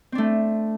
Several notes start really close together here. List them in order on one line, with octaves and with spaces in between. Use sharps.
C4 D4 A3